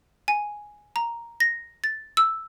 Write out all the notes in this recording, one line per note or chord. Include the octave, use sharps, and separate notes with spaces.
G#5
A#5
A#6
A6
E6